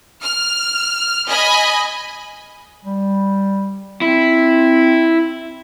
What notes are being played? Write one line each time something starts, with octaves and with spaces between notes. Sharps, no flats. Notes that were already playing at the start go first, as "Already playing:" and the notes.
F6
D#5 G#5 B5
G3
C4 E4